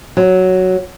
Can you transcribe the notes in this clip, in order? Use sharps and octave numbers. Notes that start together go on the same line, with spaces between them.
F#3